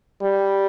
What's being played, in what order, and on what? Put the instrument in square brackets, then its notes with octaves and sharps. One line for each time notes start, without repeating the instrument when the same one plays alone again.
[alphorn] G3